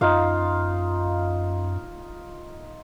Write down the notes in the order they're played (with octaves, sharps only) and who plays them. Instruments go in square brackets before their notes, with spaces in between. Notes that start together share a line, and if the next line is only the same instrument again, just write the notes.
[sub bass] F#2 [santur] D#4 F4 F5